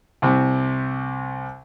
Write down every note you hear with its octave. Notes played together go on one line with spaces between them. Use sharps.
C2 C3